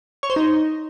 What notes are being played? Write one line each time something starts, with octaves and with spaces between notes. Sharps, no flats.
C#5
C5
D#4